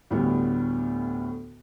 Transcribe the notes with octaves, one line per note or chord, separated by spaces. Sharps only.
D2 A2 G3 A3 B3